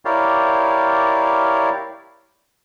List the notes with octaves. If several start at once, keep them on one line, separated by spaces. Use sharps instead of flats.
E4 G4 A#4 C#5 D5 F5